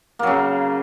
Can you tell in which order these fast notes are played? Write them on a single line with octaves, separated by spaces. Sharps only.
A#3 F#3 C#3